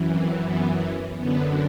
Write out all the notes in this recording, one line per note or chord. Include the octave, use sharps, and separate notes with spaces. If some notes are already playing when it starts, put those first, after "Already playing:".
Already playing: F#2 E3
C4
B3
F#2 D3 B3